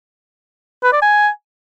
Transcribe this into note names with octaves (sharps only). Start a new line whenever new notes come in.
B4
D5
G#5